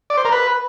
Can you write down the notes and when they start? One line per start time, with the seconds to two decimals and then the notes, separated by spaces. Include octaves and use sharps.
0.10 D5
0.17 C5
0.25 A#4
0.32 B4